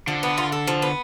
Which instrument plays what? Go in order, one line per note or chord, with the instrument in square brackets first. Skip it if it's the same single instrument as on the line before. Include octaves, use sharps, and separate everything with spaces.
[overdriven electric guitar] D3 [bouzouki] F3
[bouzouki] B3
F4
A4
F3
B3